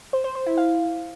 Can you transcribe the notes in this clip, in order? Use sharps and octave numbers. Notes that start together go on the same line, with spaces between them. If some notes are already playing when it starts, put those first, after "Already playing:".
C5
C5
C5
E4
F5